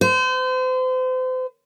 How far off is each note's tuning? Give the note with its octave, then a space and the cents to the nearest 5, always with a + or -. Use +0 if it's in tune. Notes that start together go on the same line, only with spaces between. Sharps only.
C5 -35